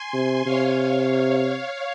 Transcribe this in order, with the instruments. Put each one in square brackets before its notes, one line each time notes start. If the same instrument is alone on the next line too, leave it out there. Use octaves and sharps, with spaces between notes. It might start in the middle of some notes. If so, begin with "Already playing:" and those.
Already playing: [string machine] G#5 C6
[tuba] C3
[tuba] C3 [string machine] C#5 F5